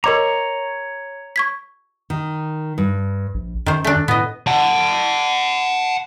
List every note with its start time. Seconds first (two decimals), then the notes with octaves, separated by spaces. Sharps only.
0.04 A#4 C#5 D#5 A#5 D6
1.36 C#6 G#6 B6
2.10 D#3
2.78 G2
3.34 A#1
3.66 F#2 D#3 C5
3.84 A3 D4
4.08 A2 B3 D#5
4.47 F#5 A5